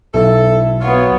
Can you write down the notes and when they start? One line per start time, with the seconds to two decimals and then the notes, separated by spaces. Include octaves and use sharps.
0.14 B1 E4 A4
0.81 F#3 B3 F4 C#5